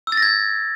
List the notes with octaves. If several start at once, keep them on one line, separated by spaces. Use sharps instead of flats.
E6
A6
A#6
G#6